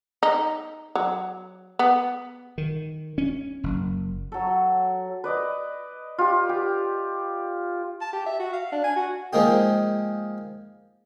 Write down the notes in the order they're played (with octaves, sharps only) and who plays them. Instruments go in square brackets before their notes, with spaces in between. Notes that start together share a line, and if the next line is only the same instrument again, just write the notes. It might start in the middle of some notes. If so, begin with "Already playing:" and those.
[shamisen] D#4
F#3
B3
[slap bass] D#3
C#4
F#1
[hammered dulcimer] F#3 A4
[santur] B4 D5 D#5
F4 G4
G4
[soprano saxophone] A5
G4
E5
F#4
F5
D4
G#5
F#4
[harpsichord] F3 G#3 A#3 D#4 G4